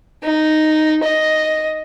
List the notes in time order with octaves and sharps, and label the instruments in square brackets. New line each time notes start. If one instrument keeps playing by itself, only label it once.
[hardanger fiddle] D#4
D#5